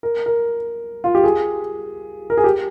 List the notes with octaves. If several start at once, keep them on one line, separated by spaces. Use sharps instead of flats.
A#4
A#4
F4
G4
G#4
A#4
G#4
G4